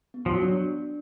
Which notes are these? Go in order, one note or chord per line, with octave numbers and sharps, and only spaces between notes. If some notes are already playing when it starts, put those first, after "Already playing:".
B3
F3
F#3
D4